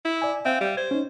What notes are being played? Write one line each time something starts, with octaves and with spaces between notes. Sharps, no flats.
E4
D5 G#5
C4 E5 F5
G3
C5 G#6
C#4 D#4